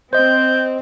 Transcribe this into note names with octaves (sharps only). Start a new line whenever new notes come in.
C4 C5 D#5 G6